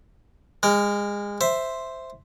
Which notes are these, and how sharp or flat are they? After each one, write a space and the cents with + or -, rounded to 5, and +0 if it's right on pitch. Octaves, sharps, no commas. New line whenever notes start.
G#3 -25 A#4 +0
C5 +0 E5 +0